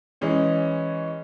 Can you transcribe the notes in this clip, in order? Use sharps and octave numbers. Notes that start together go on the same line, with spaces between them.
E3 G#3 C#4 D#4